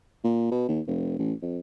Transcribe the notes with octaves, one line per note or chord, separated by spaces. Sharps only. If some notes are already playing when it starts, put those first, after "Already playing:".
A#2
B2
D#2
F1
A1
F2